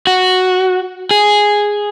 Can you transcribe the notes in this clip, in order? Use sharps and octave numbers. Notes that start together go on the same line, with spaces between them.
F#4
G#4